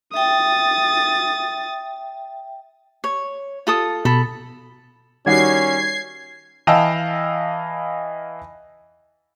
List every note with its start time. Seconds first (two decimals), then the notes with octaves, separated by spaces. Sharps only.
0.14 E5 G5 D#6 A6
3.04 C#5
3.67 F4 A4 D#6
4.05 B2 A4 B5
5.26 D#3 G3 C#4 F#4 G#6 C7
6.67 E3 D#5 F5 G5 A5 E6